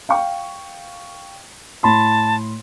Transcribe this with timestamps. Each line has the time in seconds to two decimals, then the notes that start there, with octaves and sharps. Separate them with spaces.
0.09 F5 G5 C#6
1.83 A2 A5 B5 C6